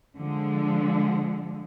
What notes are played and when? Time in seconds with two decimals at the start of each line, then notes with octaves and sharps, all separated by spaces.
0.16 D3 F3 G#3